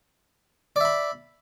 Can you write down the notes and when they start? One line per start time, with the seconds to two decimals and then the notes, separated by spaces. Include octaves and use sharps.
0.76 D5
0.80 E5
0.85 B5